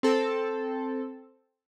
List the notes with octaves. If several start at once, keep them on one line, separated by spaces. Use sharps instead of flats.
C4 A4